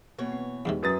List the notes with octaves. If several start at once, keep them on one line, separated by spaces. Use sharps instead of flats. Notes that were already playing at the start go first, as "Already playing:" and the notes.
B2 E3 A#3 C#5
C4
E2 G#2 C3
F#2 F#3 B4 A#5 D#6 A6